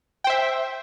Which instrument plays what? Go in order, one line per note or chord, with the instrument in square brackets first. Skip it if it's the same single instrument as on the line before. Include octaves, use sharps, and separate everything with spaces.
[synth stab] G5
C5
E5